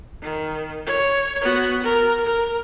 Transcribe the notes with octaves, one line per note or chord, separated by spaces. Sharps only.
D#3
C#5
B3 F#4
A#4
A#4